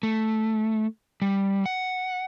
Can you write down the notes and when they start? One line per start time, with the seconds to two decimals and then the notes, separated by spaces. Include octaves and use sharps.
0.03 A3
1.22 G3
1.66 F#5